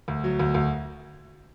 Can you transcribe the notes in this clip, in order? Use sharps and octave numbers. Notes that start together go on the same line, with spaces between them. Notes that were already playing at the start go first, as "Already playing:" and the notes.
D2
F#3
D2
D2